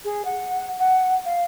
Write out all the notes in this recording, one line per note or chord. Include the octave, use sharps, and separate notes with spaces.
G#4
F#5
F#5
F5